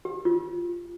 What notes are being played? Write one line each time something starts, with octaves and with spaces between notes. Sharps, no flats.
G4
F4